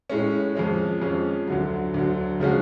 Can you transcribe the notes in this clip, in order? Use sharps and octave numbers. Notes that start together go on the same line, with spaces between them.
A2 G#3 C#4
F2 F3 G#3 C#4
F2 F3 G#3 C#4
D2 D3 F#3
D2 D3 F#3
C#3 F3 G#3 C#4 F#4